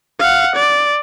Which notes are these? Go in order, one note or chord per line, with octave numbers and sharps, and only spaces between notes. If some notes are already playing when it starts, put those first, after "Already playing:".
F5 F#5
D5